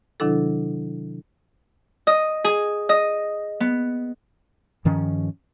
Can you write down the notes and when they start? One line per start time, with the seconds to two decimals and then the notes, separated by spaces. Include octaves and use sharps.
0.20 C3 D#3 F#3 D4 E4 A4
2.07 D#5
2.44 G#4
2.89 D#5
3.60 B3
4.85 G2 D#3 F3 C#4